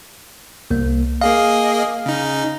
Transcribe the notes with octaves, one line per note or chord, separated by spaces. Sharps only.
C2 A#3
A#3 G#4 D#5 F5
C#3 D#4